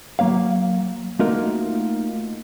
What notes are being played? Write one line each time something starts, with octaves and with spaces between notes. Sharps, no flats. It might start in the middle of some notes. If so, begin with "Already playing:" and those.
F#3 G#3 A#3 C#5 F5
A3 A#3 D#4 F4 F#4 A#4